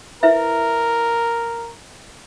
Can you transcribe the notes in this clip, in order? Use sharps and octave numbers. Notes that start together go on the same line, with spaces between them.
E4 A#4 B4 E5